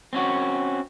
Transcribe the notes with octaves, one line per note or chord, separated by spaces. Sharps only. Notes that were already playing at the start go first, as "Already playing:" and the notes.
C4 C#4 F#4